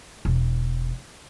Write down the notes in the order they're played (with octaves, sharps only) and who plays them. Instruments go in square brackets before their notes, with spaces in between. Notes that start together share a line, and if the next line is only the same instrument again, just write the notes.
[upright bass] E1